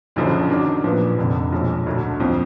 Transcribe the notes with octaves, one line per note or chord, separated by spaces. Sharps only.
F#1 F#2 D3 F3
D#3 F#3 D4
A#1 A#2 F3 B3
F1 F2 D3
B1 A#2 F3 G#3
D2 D3 F#3
F2 F3